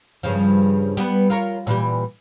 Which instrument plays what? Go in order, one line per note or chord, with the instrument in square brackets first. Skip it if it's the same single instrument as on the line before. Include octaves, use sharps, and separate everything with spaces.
[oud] G2 C#3 F3
G3 B3 B4
F4 A#4 C#5
A#2 E3 G3